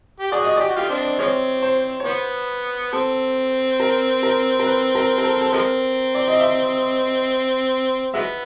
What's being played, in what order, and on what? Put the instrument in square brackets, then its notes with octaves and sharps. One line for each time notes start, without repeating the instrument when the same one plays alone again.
[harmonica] G4
[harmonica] F#4 G#4 [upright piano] D5
[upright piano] D#5
[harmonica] G4 [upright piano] D5
[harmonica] F#4
F4 G4
C4 D4
[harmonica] F3 G#3 C4 [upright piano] C#5
[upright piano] C5
C#5
[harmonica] B3 [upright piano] C5
[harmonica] C4 [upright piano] A4
[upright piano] A#4
A#4
A#4
B4
A#4
A#4
A4
A4
[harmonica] F3 G#3 C4 [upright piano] A#4
[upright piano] D5
D#5
E5
[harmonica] F#3 G#3 B3 [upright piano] E5